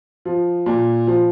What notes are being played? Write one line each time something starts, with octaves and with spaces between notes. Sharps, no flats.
F3
A#2
F3